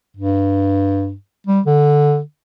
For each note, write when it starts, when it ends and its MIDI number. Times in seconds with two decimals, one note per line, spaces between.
0.16 1.14 43
1.47 1.61 55
1.66 2.20 50